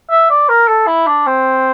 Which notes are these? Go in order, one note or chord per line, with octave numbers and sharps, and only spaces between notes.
E5
D5
A#4
A4
E4
D4
C4